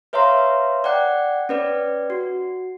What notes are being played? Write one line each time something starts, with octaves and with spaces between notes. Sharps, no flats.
B4 C#5 E5 F5 A#5 C6
D5 F#5 G5 F#6
C#4 B4 D5
F#4